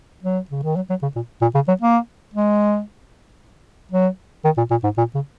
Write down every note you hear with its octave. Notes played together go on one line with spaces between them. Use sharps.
F#3
C#3
D#3
F#3
F#3
C#3
A#2
A#2
C#3
F#3
A#3
G#3
F#3
D#3
A#2
A#2
G#2
A#2
C#3